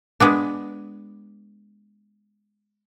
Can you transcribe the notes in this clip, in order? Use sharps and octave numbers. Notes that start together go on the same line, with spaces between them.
G#3 B3 D4